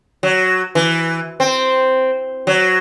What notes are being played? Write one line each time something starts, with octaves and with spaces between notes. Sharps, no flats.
F#3
E3
C4
F#3